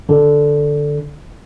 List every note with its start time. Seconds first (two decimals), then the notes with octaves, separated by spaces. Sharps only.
0.09 D3